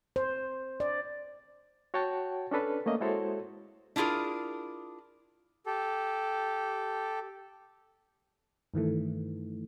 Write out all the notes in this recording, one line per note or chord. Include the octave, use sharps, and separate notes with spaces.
C5
D5
F#4 C#5 F#5 G5 A5
C#4 D4 A4 B4
A3 A#3 C#4 D#5
G#3 E4 F#4 A4 C5 C#5
D4 E4 F4 G#4 A#4
G4 A4
G2 D#3 E3 A3